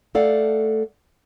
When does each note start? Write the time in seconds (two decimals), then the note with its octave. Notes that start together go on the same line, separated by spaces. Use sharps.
0.15 A3 A4 D5 F5 F#5